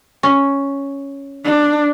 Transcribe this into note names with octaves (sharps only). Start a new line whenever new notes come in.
C#4
D4